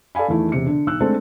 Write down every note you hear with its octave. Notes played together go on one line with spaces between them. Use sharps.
A4 D5 F5 G#5 B5
E2 D#3 A3 E4
E1 C3 C#7
D3
B1 E6 F#6
G#3 A3 C4 D4 A4